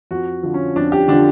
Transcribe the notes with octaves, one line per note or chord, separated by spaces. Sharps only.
F2 F#4
D3 F3
C#4
F2 D4
G4
D3 F3 D4